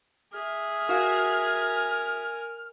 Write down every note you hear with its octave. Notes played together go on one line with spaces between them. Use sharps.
G#4 E5 F6
F#4 A#4 F5 G#5